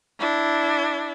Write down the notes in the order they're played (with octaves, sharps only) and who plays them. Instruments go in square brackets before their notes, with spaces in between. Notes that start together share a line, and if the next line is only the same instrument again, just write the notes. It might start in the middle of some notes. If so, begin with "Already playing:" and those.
[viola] D4 E4